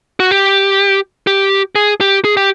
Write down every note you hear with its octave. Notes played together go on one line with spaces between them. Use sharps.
F#4
G4
G4
G#4
G4
G#4
G4